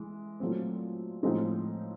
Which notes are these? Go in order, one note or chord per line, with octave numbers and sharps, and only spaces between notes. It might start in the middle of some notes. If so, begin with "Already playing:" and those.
Already playing: E3 G#3
A#2 F#3 A3 C4
A2 F3 G#3 C4 D#4